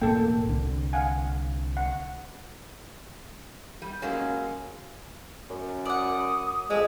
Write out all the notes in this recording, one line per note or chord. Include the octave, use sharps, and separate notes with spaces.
E1 A2 A#3 A4 G5
C2 D3
F5 F#5 G#5
F#5
G3
F#3 G#3 A#3 C#4
F#2
D5 F#5 D#6
F2 G#3 E5